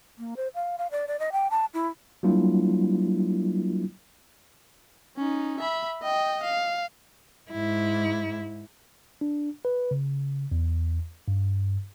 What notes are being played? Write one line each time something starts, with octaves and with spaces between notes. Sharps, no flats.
A#3
C5
F5
F5
D5
D5
D#5
G5
A5
E4
F#3 G3 A#3 D4 E4 F4
C#4 D#4
E5 B5
D#5 G5
F5
G#2 E4
D4
B4
C#3
E2
G2